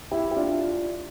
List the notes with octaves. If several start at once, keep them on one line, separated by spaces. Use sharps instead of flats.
E4 G4
G4
D4 F4